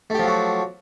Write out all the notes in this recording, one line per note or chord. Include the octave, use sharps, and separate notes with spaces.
F3 F#3 A3 F#4 G4